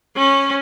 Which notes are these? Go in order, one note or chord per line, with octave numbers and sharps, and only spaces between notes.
C#4